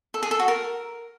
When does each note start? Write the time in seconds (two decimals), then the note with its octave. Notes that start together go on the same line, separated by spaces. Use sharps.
0.14 A4
0.23 G#4
0.31 A4
0.39 F#4
0.48 A#4